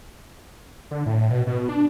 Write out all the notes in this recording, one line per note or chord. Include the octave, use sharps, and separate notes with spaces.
D3
A2
B2
B2
D4